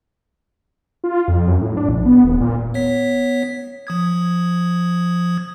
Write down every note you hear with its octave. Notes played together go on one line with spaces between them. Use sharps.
F4
F2
F#2
A2
D4
A#1
B3
D#1
A#2
B3 C#5 B6
F3 D#6 G#6